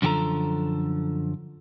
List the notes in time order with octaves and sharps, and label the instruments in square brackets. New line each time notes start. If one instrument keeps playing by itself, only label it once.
[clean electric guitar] F#2 D3 F3 G4 A4 A#5